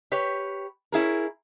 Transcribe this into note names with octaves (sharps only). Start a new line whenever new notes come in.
G4 B4 C#5
C#4 E4 G#4 A#4